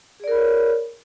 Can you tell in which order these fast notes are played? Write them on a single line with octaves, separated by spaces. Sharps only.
G#4 D5 A#4 B5 C#5